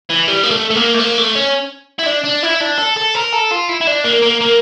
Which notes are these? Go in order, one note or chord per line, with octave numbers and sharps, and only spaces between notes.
E3
G3
A#3
A3
A3
A#3
A3
A#3
A3
C#4
E4
D4
D4
E4
D4
A4
A4
A#4
A4
F4
E4
E4
D4
A#3
A#3
A#3